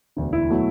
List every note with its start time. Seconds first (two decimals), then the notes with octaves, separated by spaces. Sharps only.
0.16 E1 D2 D3
0.33 E4
0.50 B2 F#3 A3